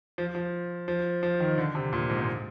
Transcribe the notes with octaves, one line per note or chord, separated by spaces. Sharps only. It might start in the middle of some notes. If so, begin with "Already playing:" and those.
F3
F3
F3
F3
D#3
D3
C3
A#2
G#2
G#2